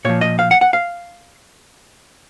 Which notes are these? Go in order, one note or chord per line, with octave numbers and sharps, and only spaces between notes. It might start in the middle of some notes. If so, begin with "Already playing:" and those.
A#2 F3 C#5
D#5
F5
F#5
F#5
F5